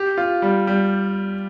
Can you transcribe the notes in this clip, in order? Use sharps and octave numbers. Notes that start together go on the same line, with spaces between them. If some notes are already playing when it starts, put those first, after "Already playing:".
Already playing: G4
F4
G3
G3